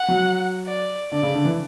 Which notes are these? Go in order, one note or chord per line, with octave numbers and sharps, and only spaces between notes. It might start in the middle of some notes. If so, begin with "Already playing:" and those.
Already playing: F#5
F#3
D5
D3 D5
C#3
D3
E3